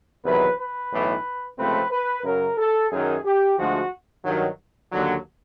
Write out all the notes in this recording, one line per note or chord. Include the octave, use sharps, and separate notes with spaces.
E2 C3 D#3 F#3 B4
B4
B1 A2 E3
C#2 C3 F3 A3 C4 B4
B4
F#2 C#3 F#3 A#4
A4
F#2 D#3 F#3 G#4
G4
D2 D3 F3 G#3 F#4
G2 D#3 F#3
D#2 D3 F#3